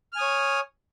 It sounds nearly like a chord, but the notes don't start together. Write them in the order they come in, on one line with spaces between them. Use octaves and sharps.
F6 G#5 D#6 C#5